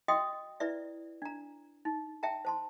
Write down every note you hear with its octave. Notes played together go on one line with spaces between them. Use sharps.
F#4 D#5 E5 G5 C6 D#6
E4 B4 D5 E5
D4 A#5
D#4
E5 G5 A5 A#5
C5 A5 C6